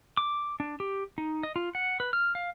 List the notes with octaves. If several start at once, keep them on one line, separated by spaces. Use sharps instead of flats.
D6
D4
G4
D#4
D#5
F4
F#5
B4
F6
F5